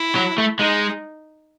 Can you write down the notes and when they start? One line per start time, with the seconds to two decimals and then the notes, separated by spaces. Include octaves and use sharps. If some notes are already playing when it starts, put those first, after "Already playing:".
Already playing: E4
0.16 F#3
0.38 A3
0.59 G#3 D#4